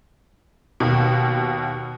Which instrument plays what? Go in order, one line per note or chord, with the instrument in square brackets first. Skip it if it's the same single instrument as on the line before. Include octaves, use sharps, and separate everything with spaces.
[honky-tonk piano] D#2 B2